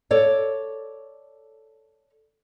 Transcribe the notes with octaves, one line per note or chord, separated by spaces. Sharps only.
A4 C#5 D5